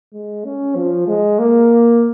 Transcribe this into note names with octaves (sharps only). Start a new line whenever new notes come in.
G#3
C#4
F3
G#3
A#3